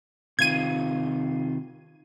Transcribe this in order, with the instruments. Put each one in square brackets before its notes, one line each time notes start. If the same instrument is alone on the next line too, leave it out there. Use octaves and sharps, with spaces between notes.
[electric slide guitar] C3 D#3 F4 [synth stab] G#6 D#7